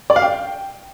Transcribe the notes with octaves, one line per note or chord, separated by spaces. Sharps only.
D5
F5
G5